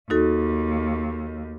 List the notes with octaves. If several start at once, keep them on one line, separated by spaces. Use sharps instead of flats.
D#2 D#4 F#4 A4